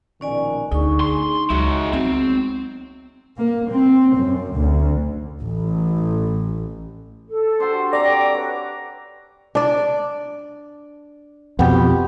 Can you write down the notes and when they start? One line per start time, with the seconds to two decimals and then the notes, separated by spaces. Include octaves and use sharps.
0.21 A#1 B2 D#3 C#4 D5 G#5
0.71 D2 D3 D#4 G#4 C#6
1.00 C6
1.50 C#2 F#3 G#3 E4 F#4
1.93 B3 C4
3.38 A#3
3.70 C4
4.17 F#2
4.54 D2
5.40 A1
7.28 A4
7.60 D4 F#4 G4 C5
7.93 C4 A4 D5 G5 A#5 D6
8.35 B4 C#5
9.55 D4 D5
11.59 F2 B2 B3 G4